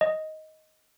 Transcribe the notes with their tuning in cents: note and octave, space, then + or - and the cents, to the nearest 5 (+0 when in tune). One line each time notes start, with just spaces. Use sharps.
D#5 +10